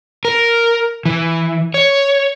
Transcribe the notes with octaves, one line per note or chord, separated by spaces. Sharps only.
A#4
E3
C#5